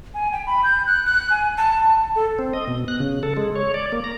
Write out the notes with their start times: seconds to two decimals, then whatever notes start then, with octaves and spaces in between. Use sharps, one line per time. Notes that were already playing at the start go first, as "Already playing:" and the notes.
0.14 G#5
0.32 G5
0.47 B5
0.64 G6
0.87 F#6
1.06 F#6
1.30 G#5
1.58 A5
1.88 A5
2.15 A4
2.39 C4
2.53 D#5
2.68 B2
2.88 F#6
3.00 C#3
3.23 A4
3.37 G#3
3.56 C#5
3.74 D5
3.92 A#3
4.04 A#5